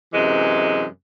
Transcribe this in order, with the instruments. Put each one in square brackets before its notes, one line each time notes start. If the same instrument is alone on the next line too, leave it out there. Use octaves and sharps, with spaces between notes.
[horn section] F#2 C3 E3 G#3